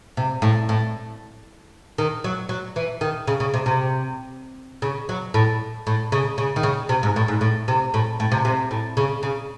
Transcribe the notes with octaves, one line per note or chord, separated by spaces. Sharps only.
C3
A2
A2
D#3
F#3
F#3
E3
D#3
C#3
C#3
C3
C3
C#3
F#3
A2
A2
C#3
C#3
D#3
C#3
C3
G#2
A2
G#2
A2
C3
A2
A2
C3
C3
A2
C#3
C#3